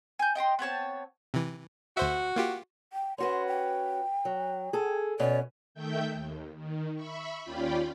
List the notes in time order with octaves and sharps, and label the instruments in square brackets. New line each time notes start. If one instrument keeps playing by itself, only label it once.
[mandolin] G#5 G6
D#5 G5 A#5 C6
B3 C4 C#5 A5
[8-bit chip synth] C3 E3
[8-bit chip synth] D2 C5 E5 [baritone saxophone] F#4
[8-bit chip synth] A#3 F4 G4
[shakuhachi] G5
[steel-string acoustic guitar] C#4 F#4 B4 [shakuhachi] C6
[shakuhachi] G5
[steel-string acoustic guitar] F#3
G#4 A4
[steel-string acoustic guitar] B2 C#4 [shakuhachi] D5
[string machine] D#3 A3 E5 G5 G6
D#2
D#3
E5 B5 C#6
D#2 C#4 F4 D5 G5 B5